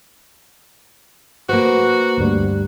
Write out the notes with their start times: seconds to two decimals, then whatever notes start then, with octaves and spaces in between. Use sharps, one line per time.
1.49 A#3 F#4 B4 C5
2.17 D2 G2 G3